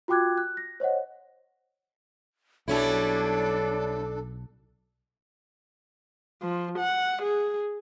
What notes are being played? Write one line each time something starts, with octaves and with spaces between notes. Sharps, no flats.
F4 F#4 G5 D6 F#6 G#6
F#6
A#6
C5 C#5 D#5 F#5
B1 F#3 G3 C#4 D4 E4 A4
F3
F#5
G#4